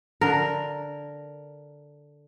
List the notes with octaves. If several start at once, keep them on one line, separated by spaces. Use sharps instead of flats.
D3 A#4